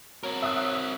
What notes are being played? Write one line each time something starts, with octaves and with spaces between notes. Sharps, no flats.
F#3 C4 A#4
E5 D#6 F#6